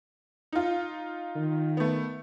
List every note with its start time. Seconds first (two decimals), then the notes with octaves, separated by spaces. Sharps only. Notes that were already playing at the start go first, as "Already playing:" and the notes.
0.52 D#4 F4
1.36 D#3
1.77 A3 B3